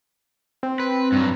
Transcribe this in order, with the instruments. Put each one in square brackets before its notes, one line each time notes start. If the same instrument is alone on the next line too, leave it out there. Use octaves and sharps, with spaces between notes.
[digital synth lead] C4
[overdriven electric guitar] B4
G2 F#3